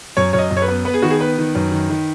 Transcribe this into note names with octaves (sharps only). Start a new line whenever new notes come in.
F#2 C#5
F#2 C#5
D#5
F#2
C#5
B4
B3
B3 B4
G#4
D#3 F#4
G#4
B3 B4
D#3
F#2
D#3
D#3